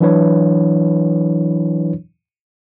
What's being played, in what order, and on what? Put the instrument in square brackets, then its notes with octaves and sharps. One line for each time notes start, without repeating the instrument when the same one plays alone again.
[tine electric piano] E3 F#3 D4 E4 B4 C#5